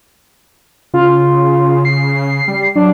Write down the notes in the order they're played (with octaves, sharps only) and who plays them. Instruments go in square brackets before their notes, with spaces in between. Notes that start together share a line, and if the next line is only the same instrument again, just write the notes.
[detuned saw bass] C#3 [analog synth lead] F4
[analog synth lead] C7
[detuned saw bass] G3
[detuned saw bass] F#3 [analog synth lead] D4